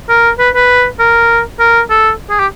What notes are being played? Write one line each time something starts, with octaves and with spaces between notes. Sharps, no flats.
A#4
B4
B4
A#4
A#4
A4
G#4
G4